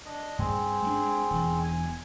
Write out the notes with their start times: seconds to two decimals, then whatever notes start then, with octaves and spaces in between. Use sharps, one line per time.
0.05 D4 D#5
0.39 G2 C4 G#4
0.82 G#3 A3 D4
1.30 E1 E2
1.63 G#5